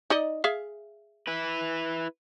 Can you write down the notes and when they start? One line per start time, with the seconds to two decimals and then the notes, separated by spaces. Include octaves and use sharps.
0.10 D#4 D5 D#5
0.44 G#4 E5 F5
1.27 E4 B4